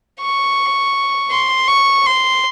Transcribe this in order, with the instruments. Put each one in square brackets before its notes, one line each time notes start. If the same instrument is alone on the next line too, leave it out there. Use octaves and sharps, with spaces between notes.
[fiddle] C#6
C6
C#6
C6